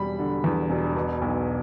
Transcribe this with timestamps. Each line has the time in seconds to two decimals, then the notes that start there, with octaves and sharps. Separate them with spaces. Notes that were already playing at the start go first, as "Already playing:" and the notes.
Already playing: E1 G3 B5
0.19 D3
0.44 E2
0.70 E1
0.96 B2
1.22 B1